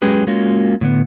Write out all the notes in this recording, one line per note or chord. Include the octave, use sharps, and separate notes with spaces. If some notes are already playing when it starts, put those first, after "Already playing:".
F#3 G#3 C#4 G4 G#4 B4
G#3 A#3 C#4 F4 F#4
A2 D3 B3